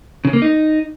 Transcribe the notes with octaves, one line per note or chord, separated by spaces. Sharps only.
C#3
A#3
D#4